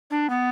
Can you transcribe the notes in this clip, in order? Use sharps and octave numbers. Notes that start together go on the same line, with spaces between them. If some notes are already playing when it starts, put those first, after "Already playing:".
D4
B3